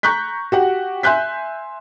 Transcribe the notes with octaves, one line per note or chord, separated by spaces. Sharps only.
A#5 C#6 F#6 G6 B6
F#4 G4 F#5
E5 G#5 C6 F#6 G6 B6